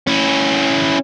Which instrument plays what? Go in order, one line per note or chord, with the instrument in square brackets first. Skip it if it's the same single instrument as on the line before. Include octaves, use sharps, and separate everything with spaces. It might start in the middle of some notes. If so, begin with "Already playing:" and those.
[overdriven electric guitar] C#4 E4